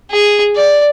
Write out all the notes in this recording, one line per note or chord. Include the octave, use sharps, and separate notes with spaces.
G#4
D5